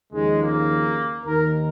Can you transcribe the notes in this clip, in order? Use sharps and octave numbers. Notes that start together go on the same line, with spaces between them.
D#2 C#3 F3 G#3
A#3
D#2 D#3 A#4